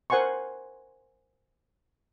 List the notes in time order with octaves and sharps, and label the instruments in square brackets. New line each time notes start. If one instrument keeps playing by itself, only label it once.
[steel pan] A#4 C5 F#5 G#5 C6 C#6